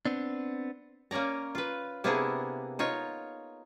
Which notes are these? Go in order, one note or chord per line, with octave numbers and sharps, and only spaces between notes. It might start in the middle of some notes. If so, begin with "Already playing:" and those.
B3 C4 D4
A#3 C#4 C#5 D5 A#5
F4 B4
C3 A#3 B3 D4 E4 G#4
D#4 F4 C#5